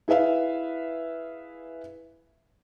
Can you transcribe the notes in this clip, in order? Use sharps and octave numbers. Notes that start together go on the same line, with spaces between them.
E4 G#4 B4 E5 F5